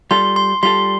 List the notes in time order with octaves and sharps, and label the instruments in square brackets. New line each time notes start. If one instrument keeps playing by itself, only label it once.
[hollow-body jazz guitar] G3 F4 A4 [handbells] C6
[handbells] C6
[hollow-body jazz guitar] G3 F4 A4 [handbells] C6